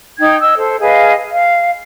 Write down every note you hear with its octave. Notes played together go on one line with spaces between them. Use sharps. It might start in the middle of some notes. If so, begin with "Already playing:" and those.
D#4 G5 G#6
D#5 E6
A4 C5
G#4 B4 D#5 F5
F5